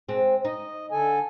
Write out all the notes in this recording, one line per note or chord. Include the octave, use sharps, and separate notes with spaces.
G#3 C4
D#4 D#5
D3 A4 G#5